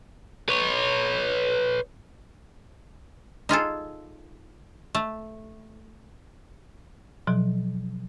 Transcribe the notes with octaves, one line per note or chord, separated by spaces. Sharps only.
B4 C#5
D#4 F4 G#4 A4
A3
B2 F3 F#3